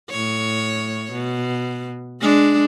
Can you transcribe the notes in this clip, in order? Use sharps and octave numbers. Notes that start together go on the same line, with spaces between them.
A2 C#5
B2
G#3 D4